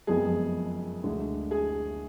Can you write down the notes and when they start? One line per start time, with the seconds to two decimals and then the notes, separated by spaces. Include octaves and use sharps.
0.07 F#1 F2 F3 G#3 B3 G#4
1.04 D2 D3 G#3
1.51 G#4